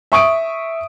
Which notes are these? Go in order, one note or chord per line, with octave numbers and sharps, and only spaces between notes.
E5 C#6 D#6 D7